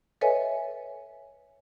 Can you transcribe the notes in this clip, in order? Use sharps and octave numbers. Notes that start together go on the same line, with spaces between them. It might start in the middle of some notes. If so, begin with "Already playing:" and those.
A4 B4 C#5 D#5 E5 G#5